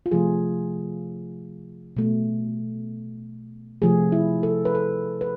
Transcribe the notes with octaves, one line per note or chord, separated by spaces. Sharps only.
F4
C3 F3 A3 G#4
B2 A3
C3 F3 A3 G#4
E4
A4
B4
A4
B4